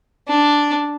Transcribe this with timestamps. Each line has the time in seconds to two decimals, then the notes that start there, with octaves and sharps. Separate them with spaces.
0.28 D4